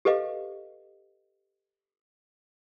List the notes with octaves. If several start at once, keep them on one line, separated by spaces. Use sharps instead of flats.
G4 A4 B4 D#5 F5